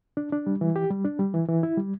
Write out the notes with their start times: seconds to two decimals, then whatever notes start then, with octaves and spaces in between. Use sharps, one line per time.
0.17 D4
0.32 D4
0.46 G3
0.61 E3
0.76 G4
0.91 G3
1.05 D4
1.19 G3
1.34 E3
1.49 E3
1.63 E4
1.77 G3